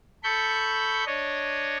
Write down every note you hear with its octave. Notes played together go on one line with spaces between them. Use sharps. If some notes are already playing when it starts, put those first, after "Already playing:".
A4 B5 C#6 G6
D4 C#5 D#5